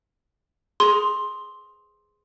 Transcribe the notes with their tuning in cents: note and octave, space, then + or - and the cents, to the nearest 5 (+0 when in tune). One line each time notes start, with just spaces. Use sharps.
G#4 +0 C6 +5